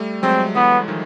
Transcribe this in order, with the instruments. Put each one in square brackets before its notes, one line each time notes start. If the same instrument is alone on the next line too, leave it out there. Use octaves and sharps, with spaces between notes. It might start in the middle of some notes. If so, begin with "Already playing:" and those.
Already playing: [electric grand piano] G3 A3
[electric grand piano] F#3 G#3 [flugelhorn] C4
[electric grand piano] E3 F#3 [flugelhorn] B3
[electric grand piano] D#3 F3